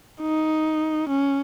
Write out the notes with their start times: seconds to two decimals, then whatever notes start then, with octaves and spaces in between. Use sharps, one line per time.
0.22 D#4
1.09 C#4